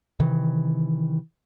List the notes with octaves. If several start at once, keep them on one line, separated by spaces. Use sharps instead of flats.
C3 D#3 E3